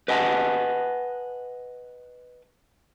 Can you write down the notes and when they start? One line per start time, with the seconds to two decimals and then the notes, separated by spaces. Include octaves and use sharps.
0.08 B4 D#5 F#5 G#5 A5